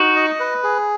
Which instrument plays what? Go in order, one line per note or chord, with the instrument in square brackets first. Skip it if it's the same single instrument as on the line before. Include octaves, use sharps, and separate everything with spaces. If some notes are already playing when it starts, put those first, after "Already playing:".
Already playing: [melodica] D#4 [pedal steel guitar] F#4
[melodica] D#5
B4
G#4